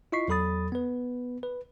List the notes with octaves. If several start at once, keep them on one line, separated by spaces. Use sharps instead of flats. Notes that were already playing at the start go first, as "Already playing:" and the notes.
E4 F4 D#5 C#6 B6 C7
E2 F#3 A4 B5 D#6 A6
B3 B4
B4